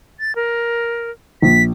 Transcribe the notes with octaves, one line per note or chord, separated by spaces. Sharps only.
A6
A#4
A#1 B6